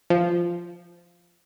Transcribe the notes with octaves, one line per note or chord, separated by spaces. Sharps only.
F3